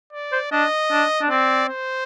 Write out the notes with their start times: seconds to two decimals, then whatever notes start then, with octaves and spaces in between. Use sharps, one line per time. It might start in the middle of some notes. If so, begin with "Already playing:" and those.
0.13 D5
0.32 C5
0.52 D4 D#5
0.91 D4
1.21 D4
1.30 C4 D5
1.69 C5